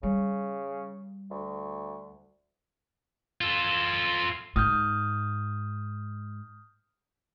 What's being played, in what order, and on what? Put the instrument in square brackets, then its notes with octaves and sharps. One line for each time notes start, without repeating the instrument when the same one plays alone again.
[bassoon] C#3 [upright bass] G3
[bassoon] D2
[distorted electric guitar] F4 A4
[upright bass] G#2 [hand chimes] D#6 F6 G6